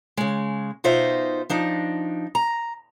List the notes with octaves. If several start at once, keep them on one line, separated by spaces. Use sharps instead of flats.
C#3 G#3
B2 D#4 F4 C5 E5
F3 D4 D#4
A#5